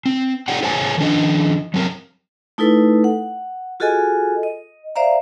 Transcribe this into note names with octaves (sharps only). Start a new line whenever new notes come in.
C4
D#4 G4 C#5 D5 F#5 G5
G#4 A4 C5 C#5 G#5 A5
D#3 F3 D4 D#5
F#3 C4 A#4
A3 D#4 E4 A4 B4
F#5
F4 F#4 G#4 A4 D#5 G#5
D#5
C5 D5 E5 F5 A#5